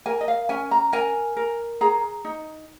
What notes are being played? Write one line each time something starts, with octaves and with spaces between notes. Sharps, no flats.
A#4 G#5
D#5
F5
C#4 G#5
A#5
A#4 G#5
A#4
G#4 A#5
D#4